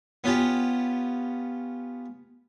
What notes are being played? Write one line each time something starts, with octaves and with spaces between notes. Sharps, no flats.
B3 C#4 F4 G4